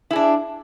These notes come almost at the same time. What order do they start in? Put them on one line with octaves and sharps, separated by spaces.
E4 G#4 D4